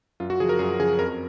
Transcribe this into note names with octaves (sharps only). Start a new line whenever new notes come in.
F#2 F4
F#4
C#3 F3 G#4
A#4
F#2 G#4
C#3 F3 G#4
F2 A#4